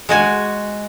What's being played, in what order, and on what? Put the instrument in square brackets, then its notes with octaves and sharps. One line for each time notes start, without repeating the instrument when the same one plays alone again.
[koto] G#3 F#4 G#5